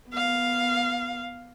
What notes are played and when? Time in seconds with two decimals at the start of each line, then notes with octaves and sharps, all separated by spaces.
0.11 B3 F5